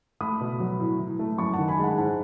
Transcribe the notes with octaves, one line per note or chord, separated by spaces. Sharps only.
A3 B5 D#6
B2
F#3
A2
E3
A3
F#2 A5 C#6
D#3 F#5 A5
G#5 B5
G#3 F#5 A5
G#2 F#5 A5